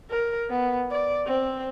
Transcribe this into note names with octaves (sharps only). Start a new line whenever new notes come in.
A#4
B3
D5
C4